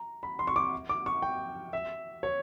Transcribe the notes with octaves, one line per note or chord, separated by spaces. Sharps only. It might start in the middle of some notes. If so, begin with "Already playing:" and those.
Already playing: A#5
B5
C6
C#6
D6
D6
C#6
G5
E5
C#5